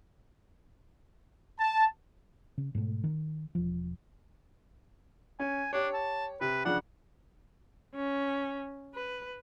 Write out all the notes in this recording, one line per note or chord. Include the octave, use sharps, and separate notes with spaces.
A5
C#3
G#2 B2 A3
D#3
E1 F3
C#4 G#5
D4 G4 C#5
A5
C3 B4
C#3 F3 D4 F#5
C#4
B4